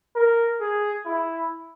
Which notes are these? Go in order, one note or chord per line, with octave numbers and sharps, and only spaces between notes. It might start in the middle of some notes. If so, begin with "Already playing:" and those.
A#4
G#4
E4